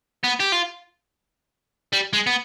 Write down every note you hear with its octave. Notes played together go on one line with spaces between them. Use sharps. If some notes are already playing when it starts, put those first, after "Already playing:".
B3
G4
F4
G3
G#3
B3